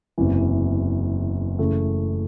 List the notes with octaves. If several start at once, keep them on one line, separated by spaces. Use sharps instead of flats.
F#1 E2 C3 E3
F#2 C#3 E3 A3